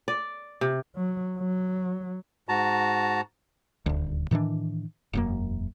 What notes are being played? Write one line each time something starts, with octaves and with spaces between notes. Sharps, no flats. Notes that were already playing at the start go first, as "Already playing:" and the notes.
D5
C3
F#3
F#3
G#2 F#4 A5 A#5
D#1 D2
A2 D#3 E3 D4
E1 F#2 A#3